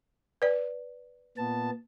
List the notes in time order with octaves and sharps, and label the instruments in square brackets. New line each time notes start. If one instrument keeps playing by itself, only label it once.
[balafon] B4 D5
[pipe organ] A#2 B3 A5